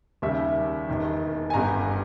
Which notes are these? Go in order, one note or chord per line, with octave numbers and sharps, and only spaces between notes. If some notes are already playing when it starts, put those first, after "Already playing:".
D#2 C#3 G3 E5
E1 E2 D#3
G#5
G1 G2 G3 B3 A#5